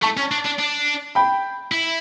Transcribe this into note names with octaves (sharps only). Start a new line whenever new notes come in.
A3 A5 C#6
C#4
D4
D4
D4
G5 B5
E4